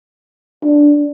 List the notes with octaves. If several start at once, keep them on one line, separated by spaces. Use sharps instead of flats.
D4